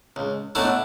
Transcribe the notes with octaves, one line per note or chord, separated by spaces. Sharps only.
C#2
B2 F#3 A3 D4 E4